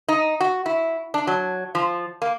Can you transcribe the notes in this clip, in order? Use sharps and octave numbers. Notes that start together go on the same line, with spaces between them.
D#4
F#4
E4
D4
F#3
F3
A#3